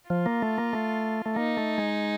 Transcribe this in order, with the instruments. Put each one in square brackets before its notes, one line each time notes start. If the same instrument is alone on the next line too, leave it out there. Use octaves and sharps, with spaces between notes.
[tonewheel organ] F3 [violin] F4
[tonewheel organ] A#3
A3
A#3
A3
A3
[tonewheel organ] A#3 [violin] D#4
[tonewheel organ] A3
G#3